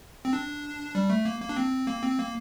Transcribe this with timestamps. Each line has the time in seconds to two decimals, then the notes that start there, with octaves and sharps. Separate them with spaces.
0.25 C4
0.33 D4
0.95 G3
1.10 A3
1.25 A#3
1.41 A#3
1.49 D4
1.56 C4
1.87 A#3
2.02 C4
2.18 A#3